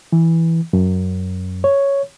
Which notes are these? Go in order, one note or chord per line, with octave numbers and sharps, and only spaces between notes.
E3
F#2
C#5